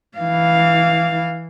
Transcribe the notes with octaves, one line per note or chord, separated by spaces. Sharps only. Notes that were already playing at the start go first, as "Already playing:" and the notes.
E3 F5